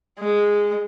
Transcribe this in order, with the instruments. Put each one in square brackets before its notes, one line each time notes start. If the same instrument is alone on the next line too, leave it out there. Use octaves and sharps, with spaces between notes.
[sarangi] G#3